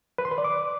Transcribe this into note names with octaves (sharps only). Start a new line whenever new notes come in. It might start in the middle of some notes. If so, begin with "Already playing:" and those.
B4
C6
B4
D5
D6